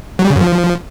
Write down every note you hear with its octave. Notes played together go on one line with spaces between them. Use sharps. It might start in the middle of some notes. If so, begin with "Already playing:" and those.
F#3
G3
C#3
F#2
F3